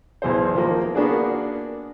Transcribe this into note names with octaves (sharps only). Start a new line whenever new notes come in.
B1 E2 G#4 C5
D#3 F3 A#3
A#3 B3 D4 F#4 G#4 D5